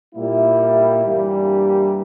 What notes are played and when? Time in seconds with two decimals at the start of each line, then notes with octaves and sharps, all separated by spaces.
0.15 A#2 G3 A#3 E4
1.05 G2 E3 G3 A#3